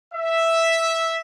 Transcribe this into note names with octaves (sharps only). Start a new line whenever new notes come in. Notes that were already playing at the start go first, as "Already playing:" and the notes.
E5